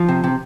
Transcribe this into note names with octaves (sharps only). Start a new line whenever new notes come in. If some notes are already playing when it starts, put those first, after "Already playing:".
Already playing: F3
C3
C3